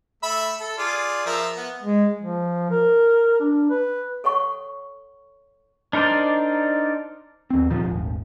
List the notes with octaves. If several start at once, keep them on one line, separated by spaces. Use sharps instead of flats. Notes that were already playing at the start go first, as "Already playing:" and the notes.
A3 E5 B5
A4
F4 G#4 D5
F3 A#4 E5
B3
G#3
F3
A#4
D4
B4
A4 C#5 F#5 C#6
D4 D#4 A#4 C5 D5
D#2 C4
A#2 D#3 F3
D#1 G#1